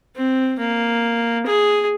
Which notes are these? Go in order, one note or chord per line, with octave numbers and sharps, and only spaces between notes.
C4
A#3
G#4